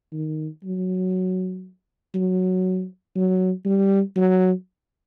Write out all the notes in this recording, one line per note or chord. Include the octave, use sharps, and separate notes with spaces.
D#3
F#3
F#3
F#3
G3
F#3